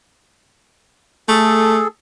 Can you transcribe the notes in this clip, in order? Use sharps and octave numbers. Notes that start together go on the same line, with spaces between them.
A3 G#4 A4